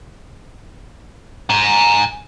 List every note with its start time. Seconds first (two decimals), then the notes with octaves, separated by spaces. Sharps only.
1.50 G#5 A#5